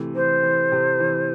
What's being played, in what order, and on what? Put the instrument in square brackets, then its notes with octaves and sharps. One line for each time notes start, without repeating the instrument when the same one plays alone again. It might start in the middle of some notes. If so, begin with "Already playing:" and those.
Already playing: [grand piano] C3 E3 A3
[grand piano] E3 [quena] C5
[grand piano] E3
C3
E3